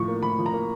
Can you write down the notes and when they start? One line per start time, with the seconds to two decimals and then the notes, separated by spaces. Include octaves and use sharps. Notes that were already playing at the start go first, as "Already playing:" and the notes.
Already playing: A2 F3 C#6
0.08 A#3
0.23 A2 B5
0.38 F3
0.46 A#5
0.53 A#3